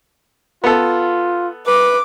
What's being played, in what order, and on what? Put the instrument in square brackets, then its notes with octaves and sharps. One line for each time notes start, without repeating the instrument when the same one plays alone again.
[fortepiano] B3 A4 [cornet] F4
[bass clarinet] B4 [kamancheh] D6